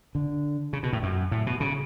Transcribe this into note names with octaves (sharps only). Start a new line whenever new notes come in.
D3
C#3
B2
A2
F#2
A2
B2
C#3